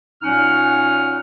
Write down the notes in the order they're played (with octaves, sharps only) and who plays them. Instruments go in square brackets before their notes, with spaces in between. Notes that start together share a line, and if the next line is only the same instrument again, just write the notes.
[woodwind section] A#2 F#3 C#4 D#4 F#5 F6